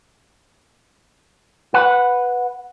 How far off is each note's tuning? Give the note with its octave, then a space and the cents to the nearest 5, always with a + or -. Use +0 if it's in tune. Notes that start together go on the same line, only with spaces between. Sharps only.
B4 +0 F#5 -15